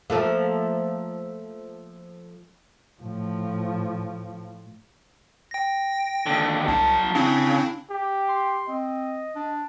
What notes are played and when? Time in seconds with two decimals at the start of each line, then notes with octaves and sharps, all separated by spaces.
0.10 F3 A3 A#3
3.02 A2 F3
5.51 G5 A#6
6.26 D#2 D3
6.68 C2 F#3 A5
7.15 C#3 C4 D4 E4
7.90 G4
8.29 C6
8.68 C4 D#5
9.35 D4